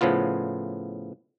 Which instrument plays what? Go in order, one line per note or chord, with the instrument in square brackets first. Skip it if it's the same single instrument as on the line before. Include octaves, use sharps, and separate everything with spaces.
[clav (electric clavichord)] A2 C#3 F3 B3 F4